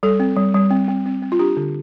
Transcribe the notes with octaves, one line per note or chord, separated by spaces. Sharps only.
G3 A4
C4
G3
G3
C4
C4
C4
C4
F4
D4 G4
D3